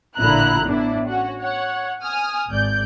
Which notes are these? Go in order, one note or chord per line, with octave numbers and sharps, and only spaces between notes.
A1 A#2 D3 E4 A#5 F#6
A2 B3 D4 E4
C#4 F#4
C#5 F#5
G#5 D#6 F6
G#1 D5 G6